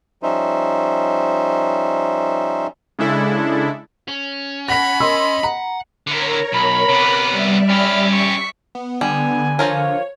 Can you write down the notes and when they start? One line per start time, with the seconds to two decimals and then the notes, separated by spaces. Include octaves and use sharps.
0.23 F3 G3 C#4 D#4 C5 E5
2.99 C#3 G#3 D4 E4 A4
4.08 C#4
4.68 F#5 B5 A#6 B6
5.00 A#4 D#5 C6 E6
5.44 F#5 A#5
6.07 D3 E4 A#4 C#5 A#5
6.53 B1 B5
6.89 C3 B3 D6 F6 F#6
7.30 G3 D5 E5
7.69 C#4 G4 B5 F6
8.13 C#6 B6
8.75 B3
9.01 D3 G3 G#5
9.59 F3 F4 A#4 C#5